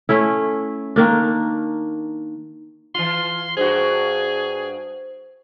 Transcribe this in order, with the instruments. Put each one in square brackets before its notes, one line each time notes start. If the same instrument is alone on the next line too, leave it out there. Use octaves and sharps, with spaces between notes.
[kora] A3 C#4 E4
D#3 A#3 D4
[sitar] E3 F4 [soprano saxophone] C6
[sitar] G2 F#4 [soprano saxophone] G#4 [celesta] C5